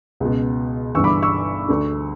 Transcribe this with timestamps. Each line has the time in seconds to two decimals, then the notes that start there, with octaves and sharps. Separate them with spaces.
0.20 C#2 B2
0.95 G1 G2 E3 C#6 E6
1.04 B5 D6
1.23 C#6 E6
1.68 D2 D3